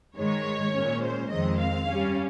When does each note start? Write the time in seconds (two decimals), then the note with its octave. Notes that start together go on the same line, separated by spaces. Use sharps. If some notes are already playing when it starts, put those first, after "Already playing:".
0.16 G#2 D#3 G#3 C#5
0.74 A#2 G#3 C#4
1.02 C5
1.30 F2 D#3 G#3 C4 D#5
1.58 F5
1.87 G2 G3 C#4